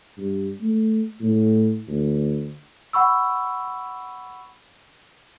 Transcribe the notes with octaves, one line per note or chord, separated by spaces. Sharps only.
G2
A3
A2
D2
F#5 B5 C#6 E6